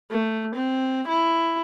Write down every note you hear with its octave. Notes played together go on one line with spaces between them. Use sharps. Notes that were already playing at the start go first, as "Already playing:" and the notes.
A3
C4
E4